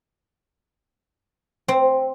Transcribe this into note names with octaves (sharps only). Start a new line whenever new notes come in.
C4